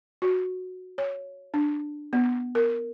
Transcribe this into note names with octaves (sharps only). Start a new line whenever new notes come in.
F#4
C#5
D4
B3
A#4